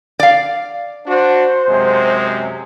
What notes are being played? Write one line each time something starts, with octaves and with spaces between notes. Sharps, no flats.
D5 F5
D4 F#4 C5
F#2 C3 G#3